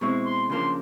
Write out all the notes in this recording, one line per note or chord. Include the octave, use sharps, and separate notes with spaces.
B2 G#3 C4 E4 C#6
C6
C#3 F3 A#3 D4 C6